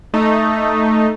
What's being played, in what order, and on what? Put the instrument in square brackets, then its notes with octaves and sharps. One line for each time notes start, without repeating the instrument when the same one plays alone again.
[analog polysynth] A3 D#4